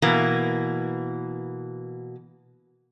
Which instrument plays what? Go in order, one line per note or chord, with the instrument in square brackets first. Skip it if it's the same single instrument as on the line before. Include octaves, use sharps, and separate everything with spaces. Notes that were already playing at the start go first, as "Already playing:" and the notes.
[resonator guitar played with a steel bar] B2 E3 A#3